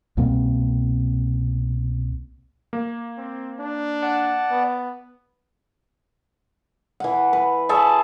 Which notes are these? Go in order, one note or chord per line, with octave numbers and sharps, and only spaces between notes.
C2 B2 A#3 C4
A#3
C4
D4
D5 F#5 A5
B3
E3 F#5
B4
G#4 E5 A5 C#6